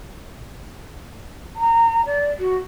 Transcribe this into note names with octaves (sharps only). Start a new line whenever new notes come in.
A#5
D5
F#4